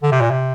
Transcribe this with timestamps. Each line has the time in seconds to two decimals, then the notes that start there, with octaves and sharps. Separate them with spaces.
0.03 D3
0.12 C3
0.21 A#2
0.31 C3